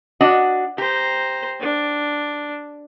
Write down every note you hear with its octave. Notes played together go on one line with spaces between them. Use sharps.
D4 F#4 D#5
G4 C5 A#5
D4